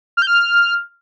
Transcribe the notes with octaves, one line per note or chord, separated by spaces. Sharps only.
F6
G6
F6